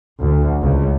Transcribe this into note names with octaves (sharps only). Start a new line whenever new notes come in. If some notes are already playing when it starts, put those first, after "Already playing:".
D2
C#2